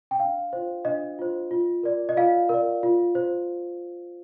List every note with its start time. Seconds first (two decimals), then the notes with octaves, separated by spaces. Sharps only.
0.11 G5
0.20 D4 F5
0.53 F4 C5
0.85 D4 D#5
1.19 F4 C5
1.51 F4
1.83 A#4 D5
2.09 D#5
2.17 F4 F5
2.49 A#4 D5
2.83 F4
3.15 C5